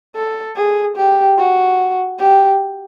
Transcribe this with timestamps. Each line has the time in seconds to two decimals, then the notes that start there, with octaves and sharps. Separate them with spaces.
0.16 A4
0.56 G#4
0.97 G4
1.38 F#4
2.19 G4